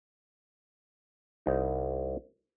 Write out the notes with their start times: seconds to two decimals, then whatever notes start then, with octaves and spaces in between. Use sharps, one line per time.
1.46 C2 D#4